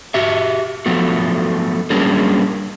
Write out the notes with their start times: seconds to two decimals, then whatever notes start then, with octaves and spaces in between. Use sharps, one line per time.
0.14 F#4 G4 E5
0.86 F3 F#3 A3 B3 F#4
1.90 F#3 G3 A#3 C#4 D4 G#4